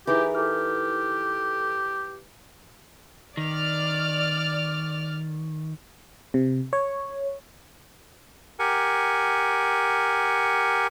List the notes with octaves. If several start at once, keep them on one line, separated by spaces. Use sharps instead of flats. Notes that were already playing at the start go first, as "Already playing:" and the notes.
E3 D#4 E4 G4 G#4 A#4
G4 A4 D6 F6
D#3 D5 F6
C3
C#5
G4 A#4 F#5 G#5